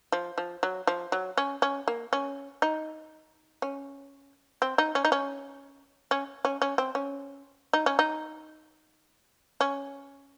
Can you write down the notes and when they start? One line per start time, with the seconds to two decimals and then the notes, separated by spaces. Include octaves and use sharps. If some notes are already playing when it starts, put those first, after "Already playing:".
0.12 F3
0.38 F3
0.63 F#3
0.87 F3
1.12 F#3
1.37 C#4
1.62 C#4
1.88 A#3
2.13 C#4
2.62 D#4
3.62 C#4
4.62 C4
4.78 D#4
4.95 C#4
5.05 D#4
5.12 C#4
6.11 C#4
6.45 C#4
6.62 C#4
6.78 C4
6.95 C#4
7.73 D#4
7.86 C#4
7.99 D#4
9.61 C#4